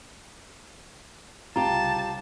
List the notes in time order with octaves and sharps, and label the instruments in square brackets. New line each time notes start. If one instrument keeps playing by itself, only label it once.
[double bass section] C2 C#3 [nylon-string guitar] F4 G4 [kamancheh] A5 [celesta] A#5